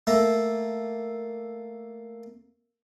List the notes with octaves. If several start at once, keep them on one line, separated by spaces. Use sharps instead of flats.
A3 A#3 E5 A#5